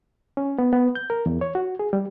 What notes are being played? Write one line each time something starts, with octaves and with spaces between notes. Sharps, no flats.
C#4
B3
B3
G6
A#4
E2
C#5
F#4
G#4
G3